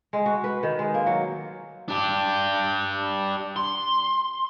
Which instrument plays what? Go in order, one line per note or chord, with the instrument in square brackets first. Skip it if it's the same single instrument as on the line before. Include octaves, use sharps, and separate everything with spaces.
[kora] G#3
F#4
B4
D#3
G#3
A#3
F#3
[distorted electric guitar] D4 G4
C6